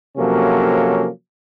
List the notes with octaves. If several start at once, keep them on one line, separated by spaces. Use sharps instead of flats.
C3 F3 F#3 A#3 C#4 A4